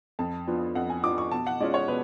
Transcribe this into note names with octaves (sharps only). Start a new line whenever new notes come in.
F2 A5
F3 B3 D4 F4
F2 F#5
G#5
F3 B3 D4 F4 D6
C#6
B2 A5
F#5
G#3 C#4 F4 D5
C#5
B2 B4